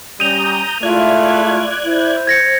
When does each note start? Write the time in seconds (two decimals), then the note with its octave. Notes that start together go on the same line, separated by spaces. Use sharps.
0.20 G3 C#4 A#5 D#6 G6 D#7 F7
0.83 G#3 A3 E4 F4 D5 F#6 G#6
1.85 E4 C5
2.27 G#6 A#6 C#7